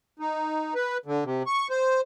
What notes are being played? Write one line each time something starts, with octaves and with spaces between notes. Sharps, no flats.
D#4
B4
D3
C3
C#6
C5